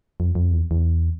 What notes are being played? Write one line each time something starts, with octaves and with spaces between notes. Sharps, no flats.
F2
F2
E2
E2